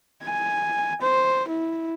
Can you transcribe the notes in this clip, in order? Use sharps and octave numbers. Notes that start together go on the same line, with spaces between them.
G#5
C5
E4